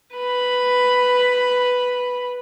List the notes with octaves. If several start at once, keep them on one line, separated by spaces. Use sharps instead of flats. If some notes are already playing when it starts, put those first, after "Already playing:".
B4 B5